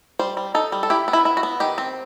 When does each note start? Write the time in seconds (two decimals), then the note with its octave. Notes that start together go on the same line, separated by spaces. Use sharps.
0.19 G3 C5
0.37 G3
0.55 D#4 A4
0.72 G3
0.83 A4
0.90 E4 G4
1.08 B3
1.13 E4
1.25 E4
1.37 F#4
1.43 B3
1.60 D#3 G4
1.78 C4